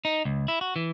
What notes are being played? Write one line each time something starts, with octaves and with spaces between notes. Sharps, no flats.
D#4
C#2
E4
F#4
E3